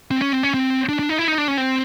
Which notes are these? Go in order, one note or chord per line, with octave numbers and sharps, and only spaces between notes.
C4
C#4
C4
C#4
C4
D4
D4
D#4
E4
D#4
D4
C#4
C4